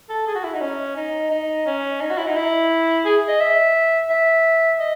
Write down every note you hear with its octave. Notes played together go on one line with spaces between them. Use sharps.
A4
G#4
F#4
E4
D#4
C#4
D#4
D#4
C#4
D#4
F#4
E4
D#4
E4
G#4
D#5
E5
E5
D#5